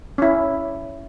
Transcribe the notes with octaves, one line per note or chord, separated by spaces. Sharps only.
C#4
E4